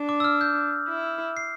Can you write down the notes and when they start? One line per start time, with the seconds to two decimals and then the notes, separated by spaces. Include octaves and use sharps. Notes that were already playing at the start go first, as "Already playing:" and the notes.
Already playing: D4
0.09 D6
0.20 E6
0.24 F6
0.41 G6
0.89 E4
1.37 C7